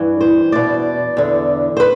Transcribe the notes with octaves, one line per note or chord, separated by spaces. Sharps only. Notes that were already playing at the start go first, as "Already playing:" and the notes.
Already playing: G2 E3
C5
E2 B2 D5
E2 D3
C5
B4